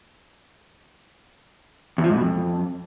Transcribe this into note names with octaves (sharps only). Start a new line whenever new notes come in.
E2
F3
G#2
B2
F2